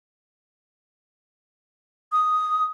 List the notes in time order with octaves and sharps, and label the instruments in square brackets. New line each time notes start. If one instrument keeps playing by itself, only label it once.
[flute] D#6